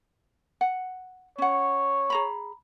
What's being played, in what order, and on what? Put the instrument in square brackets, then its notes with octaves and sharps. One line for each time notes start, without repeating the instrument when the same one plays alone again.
[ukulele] F#5
[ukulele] C#4 F#5 [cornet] C#5
[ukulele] G#4 A#5 B5